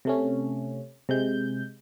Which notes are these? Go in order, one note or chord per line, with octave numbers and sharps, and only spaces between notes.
C3 A3 C#4
C3 G#3 G6